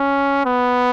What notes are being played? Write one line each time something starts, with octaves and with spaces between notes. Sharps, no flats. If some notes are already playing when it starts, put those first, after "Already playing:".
Already playing: C#4
B3